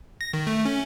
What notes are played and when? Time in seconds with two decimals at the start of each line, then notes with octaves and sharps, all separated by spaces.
0.21 A#6
0.33 D#3
0.47 A3
0.65 C#4